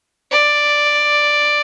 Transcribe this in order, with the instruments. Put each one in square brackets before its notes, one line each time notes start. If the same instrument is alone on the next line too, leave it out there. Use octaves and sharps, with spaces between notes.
[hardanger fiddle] D5